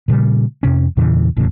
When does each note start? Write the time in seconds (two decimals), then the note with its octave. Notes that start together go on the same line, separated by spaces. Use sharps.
0.08 A#2 C#3 G3
0.63 F2 C3 C#4
0.97 E2 A#2 C#3 E3
1.37 F1 E2 A2 C#3